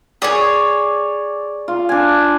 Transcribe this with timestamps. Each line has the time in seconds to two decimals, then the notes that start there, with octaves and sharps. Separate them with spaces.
0.22 G#4 C#5 D5
1.68 F4
1.89 D4 G#5